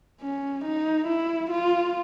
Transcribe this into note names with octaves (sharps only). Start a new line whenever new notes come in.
C#4
D#4
E4
F4